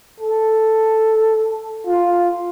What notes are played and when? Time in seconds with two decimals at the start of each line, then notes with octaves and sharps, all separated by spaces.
0.20 A4
1.87 F4